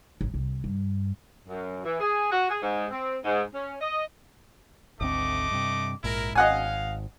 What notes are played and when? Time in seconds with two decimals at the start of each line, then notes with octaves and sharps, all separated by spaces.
0.21 A1
0.34 C2
0.64 G2
1.48 F#2
1.85 E3
2.00 G#4
2.32 F#4
2.50 G#4
2.62 G#2
2.91 C4
3.25 G#2
3.53 C#4
3.80 D#5
5.00 G#1 D2 A3 C4 D#5 D6
5.51 G2 C3
6.04 A#1 G#2 E4 A#4
6.35 G#1 D#5 F5 F#5 G#5